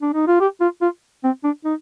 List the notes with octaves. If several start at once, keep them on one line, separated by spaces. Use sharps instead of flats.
D4
D#4
F4
G4
F4
F4
C4
D4
D#4